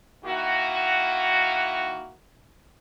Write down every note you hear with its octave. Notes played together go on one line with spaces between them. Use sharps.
D#3 A#3 E4 F#4